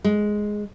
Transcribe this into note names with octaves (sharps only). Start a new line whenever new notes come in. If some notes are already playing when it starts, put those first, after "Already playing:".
G#3